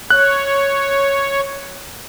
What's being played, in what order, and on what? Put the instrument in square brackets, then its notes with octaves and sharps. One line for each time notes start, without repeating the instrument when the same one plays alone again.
[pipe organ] C#5 [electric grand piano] F#6